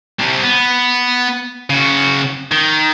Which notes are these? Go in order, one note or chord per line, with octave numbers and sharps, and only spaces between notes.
C2 C3
B3
C#3 F#4
D#3